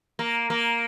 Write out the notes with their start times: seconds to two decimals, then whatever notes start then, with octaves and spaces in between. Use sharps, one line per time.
0.19 A#3
0.50 A#3